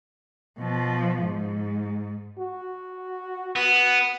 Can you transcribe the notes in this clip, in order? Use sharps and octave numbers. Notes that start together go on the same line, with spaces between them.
B2 F3
G#2
F#4
B3